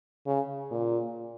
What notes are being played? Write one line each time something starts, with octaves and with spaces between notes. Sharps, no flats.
C#3
A#2